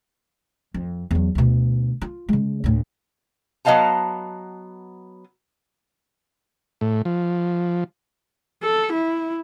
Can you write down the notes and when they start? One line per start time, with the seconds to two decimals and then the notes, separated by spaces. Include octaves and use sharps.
0.74 F2
1.11 E2 F#3
1.35 D2 B2
2.01 F4
2.29 C#3 G#3
2.64 D2 A2
3.65 F#3 B3 D#5 F5 A5 A#5
6.81 A2
7.05 F3
8.63 A4
8.92 E4